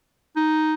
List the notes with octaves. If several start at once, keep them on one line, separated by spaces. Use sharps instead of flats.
D#4